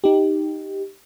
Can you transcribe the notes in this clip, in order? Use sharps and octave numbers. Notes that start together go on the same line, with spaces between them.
D#4 G4